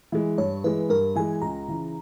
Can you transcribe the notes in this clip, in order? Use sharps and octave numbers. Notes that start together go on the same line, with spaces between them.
E3 G#3
G2 C#5
E3 G#3 B4
G2 A#4
E3 G#3 G#5
C#2 A#5
C#3 E3